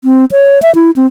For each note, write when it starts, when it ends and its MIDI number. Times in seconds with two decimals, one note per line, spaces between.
0.04 0.25 60
0.32 0.61 73
0.62 0.73 76
0.75 0.91 64
0.96 1.06 60